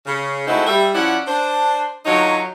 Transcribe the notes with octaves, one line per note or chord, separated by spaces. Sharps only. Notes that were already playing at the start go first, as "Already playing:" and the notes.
C#3
G#3 A3 C4 D#4 E4 F#4
G3 E5
F3 C#4 E4 D5 F#5
D4 C5
D3 F#3 D#4 F4 C#5